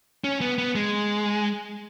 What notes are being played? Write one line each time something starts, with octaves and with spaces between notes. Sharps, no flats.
C#4
B3
B3
G#3